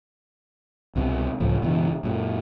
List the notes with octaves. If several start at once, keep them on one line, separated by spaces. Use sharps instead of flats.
C2 B2 G#3 C4
C#2 A2 F3
F#1 B2 E3
F#2 A#2